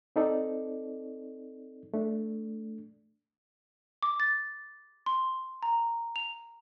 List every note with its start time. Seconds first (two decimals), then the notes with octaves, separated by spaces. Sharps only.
0.16 C4 D#4 A4 D5
1.94 A3 D4
4.03 D6
4.20 A6
5.06 C6
5.63 A#5
6.16 F7